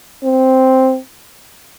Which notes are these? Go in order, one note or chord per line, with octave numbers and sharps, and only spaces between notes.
C4